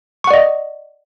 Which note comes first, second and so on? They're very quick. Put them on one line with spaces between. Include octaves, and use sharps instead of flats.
C#6 F#5 D5 D#5